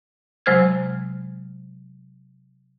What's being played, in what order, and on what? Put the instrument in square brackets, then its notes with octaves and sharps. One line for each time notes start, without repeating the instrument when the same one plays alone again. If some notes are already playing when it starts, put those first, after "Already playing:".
[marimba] C3 F#3 G#3 C5 F6 G#6